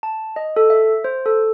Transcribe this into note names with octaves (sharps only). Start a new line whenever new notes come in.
A5
D#5
A4
E5
C5
A4